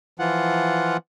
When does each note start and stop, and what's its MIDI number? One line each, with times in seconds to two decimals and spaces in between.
0.19 0.97 52
0.19 0.97 53
0.19 0.97 65
0.19 0.97 78